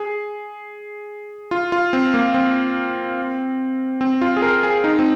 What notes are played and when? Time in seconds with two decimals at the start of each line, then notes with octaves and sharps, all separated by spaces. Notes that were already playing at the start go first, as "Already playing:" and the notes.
Already playing: G#4
1.51 F4
1.72 F4
1.93 C4
2.14 A#3
2.34 C4
4.01 C4
4.21 F4
4.37 G#4
4.42 A#4
4.63 G#4
4.84 D#4
4.99 C4